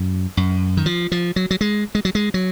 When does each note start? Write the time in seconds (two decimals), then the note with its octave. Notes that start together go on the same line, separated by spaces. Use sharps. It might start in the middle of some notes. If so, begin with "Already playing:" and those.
Already playing: F#2
0.37 F#2
0.77 D#3
0.86 F3
1.12 F3
1.36 F#3
1.51 F#3
1.61 G#3
1.95 G#3
2.05 F#3
2.15 G#3
2.34 F#3